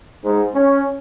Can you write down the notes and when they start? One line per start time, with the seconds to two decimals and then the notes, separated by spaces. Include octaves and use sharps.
0.24 G#2
0.54 C#4